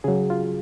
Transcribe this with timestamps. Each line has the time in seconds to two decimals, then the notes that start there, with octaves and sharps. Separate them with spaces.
0.04 C#3 F#3 G#4
0.30 F4